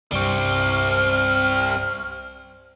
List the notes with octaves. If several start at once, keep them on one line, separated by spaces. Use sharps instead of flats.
C2 G2 G3 C4 C#6 F6